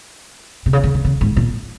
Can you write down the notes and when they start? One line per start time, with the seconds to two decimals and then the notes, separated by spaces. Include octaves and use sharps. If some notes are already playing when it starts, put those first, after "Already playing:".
0.66 C3
0.73 C#3
0.83 C#3
0.94 C3
1.04 C#3
1.21 G#2
1.37 A#2